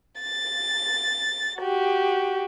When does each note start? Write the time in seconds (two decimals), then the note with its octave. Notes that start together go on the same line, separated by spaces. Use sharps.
0.20 A6
1.60 F#4 G4